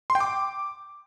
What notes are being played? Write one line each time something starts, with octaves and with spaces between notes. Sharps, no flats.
C6
G5
D6